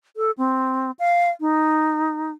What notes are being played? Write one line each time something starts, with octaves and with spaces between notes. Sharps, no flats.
A4
C4
F5
D#4